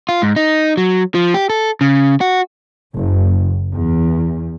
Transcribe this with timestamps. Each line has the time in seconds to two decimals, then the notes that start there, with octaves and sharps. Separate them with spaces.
0.09 F4
0.22 G#2
0.36 D#4
0.77 F#3
1.15 F3
1.34 G4
1.50 A4
1.81 C#3
2.21 F#4
2.94 F#1
3.71 E2